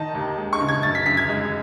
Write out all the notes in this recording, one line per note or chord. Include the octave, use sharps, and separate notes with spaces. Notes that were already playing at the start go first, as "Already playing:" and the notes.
Already playing: D#3 D#4 A5
D#2
G#3
C#6
C#3
G#6
F#2 A6
B6
F#2 B6
G#6
G#3